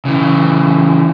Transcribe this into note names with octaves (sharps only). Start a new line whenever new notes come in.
C#3 E3